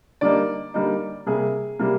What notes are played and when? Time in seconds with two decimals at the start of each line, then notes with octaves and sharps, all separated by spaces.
0.21 D3 G3 A#3 D#4 D5
0.74 D3 G3 A#3 D#4
1.26 C3 G3 A#3 G#4
1.79 C3 G3 A#3